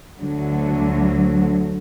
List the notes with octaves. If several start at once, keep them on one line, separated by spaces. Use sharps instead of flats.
D2 D3 F#3